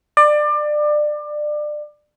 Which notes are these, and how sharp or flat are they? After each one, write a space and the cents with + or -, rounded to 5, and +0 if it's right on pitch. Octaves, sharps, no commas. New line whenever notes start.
D5 +25